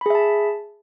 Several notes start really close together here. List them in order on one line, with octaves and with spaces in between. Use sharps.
B5 G#4 E5 A5